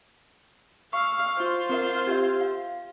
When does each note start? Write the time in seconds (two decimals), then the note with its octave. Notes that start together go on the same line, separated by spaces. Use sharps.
0.93 F5 C#6 E6
1.38 F4 C5
1.69 C4 A#4 E5
2.07 G4 E5
2.41 F5